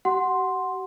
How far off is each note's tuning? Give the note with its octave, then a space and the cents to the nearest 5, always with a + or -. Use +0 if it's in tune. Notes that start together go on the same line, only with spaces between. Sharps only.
G4 -45 F#5 +0 C6 +0